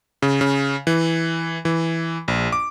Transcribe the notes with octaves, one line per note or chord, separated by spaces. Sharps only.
C#3
C#3
E3
E3
A#1
D6